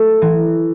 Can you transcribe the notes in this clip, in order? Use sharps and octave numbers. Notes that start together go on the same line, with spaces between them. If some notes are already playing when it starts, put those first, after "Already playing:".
Already playing: A3
E3